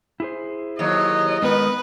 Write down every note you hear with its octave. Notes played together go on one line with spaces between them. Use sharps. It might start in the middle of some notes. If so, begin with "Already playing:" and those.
E4 G#4 C5
D#2 F#3 D#5
D#3 G#3 B3 B4